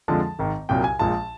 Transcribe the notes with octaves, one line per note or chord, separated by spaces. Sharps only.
F2 D3 F3 G#3 A5
G#1 G#2 D#3
C2 A#2 F#3 G5
G#5
A#1 A#2 F3 G#3 A5